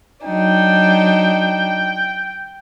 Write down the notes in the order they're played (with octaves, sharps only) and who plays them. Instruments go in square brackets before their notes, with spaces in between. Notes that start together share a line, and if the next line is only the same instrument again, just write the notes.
[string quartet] F#3 D4 D#4 [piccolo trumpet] G5